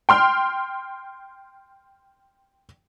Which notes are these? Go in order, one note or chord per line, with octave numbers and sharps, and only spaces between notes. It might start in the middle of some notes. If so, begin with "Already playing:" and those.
G5 C6 F6